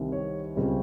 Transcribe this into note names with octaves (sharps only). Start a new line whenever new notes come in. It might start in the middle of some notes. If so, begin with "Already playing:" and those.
Already playing: C2 C3 D#3
C#5
C#2 C#3 G3 C4